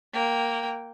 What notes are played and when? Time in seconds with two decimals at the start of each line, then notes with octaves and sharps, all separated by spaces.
0.13 A#3 G5